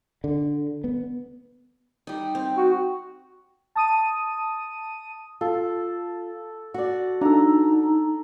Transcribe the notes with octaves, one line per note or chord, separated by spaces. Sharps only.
D3
B3
G3 D#4
C4
F#4
A5 D#6 D#7
F4 A4
F#4 D5
D4 D#4 A4 A#5